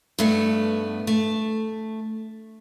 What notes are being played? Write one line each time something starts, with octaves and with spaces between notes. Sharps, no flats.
G2 A3 B3
A3